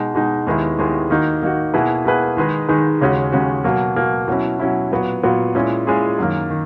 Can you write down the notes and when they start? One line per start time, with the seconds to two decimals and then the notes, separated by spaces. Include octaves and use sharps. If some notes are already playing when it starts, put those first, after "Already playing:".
Already playing: B2 G#3 D#4
0.15 B2 G#3 D#4
0.46 D#2 D#3 G#3 B3 E4
0.78 D#2 D#3 G#3 B3 E4
1.10 D#3 A#3 D#4 F#4
1.42 D#3 A#3 D#4 F#4
1.74 B2 A#3 E4 G#4 B4
2.05 B2 A#3 E4 G#4 B4
2.37 D#3 G#3 D#4 G#4 B4
2.69 D#3 G#3 D#4 G#4 B4
3.01 D#2 C#3 G#3 C#4 F#4
3.32 D#2 C#3 G#3 C#4 F#4
3.64 B2 F#3 A#3
3.96 B2 F#3 A#3
4.28 B2 F#3 C#4 E4
4.60 B2 F#3 C#4 E4
4.91 A#2 F#3 B3 F#4
5.23 A#2 F#3 B3 F#4
5.55 A#2 G#3 C#4 E4 G#4
5.87 A#2 G#3 C#4 E4 G#4
6.19 F#2 D#3 A#3
6.50 D#3